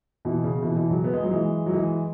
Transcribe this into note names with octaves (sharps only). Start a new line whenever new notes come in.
B2 E3
C#3
B2 E3
B2 E3
C#3 F#3
B3
G#3
F#3
E3 G#3
F#3
E3 G#3